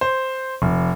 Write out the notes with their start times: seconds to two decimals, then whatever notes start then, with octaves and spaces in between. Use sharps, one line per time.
0.01 C5
0.62 F1